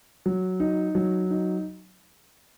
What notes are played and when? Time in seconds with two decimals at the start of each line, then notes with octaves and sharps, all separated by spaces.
0.26 F#3
0.60 D#4
0.95 F#3
1.31 D#4